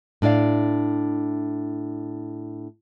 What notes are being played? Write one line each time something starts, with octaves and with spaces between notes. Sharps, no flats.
A2 D4 E4 D5 F5